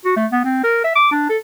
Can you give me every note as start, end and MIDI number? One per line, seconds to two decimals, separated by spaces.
0.05 0.14 66
0.16 0.26 57
0.32 0.40 59
0.44 0.61 60
0.64 0.80 70
0.84 0.94 76
0.96 1.10 86
1.12 1.26 62
1.29 1.38 69